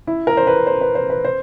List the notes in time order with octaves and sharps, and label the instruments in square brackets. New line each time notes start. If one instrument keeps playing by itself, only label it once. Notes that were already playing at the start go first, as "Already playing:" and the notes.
[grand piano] E4
A#4
C5
B4
C5
B4
C5
B4
C5